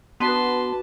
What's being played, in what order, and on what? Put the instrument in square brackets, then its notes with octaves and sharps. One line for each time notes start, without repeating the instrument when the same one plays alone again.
[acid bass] B3 [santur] D4 F#4 [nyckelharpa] B4 A5 [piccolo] C6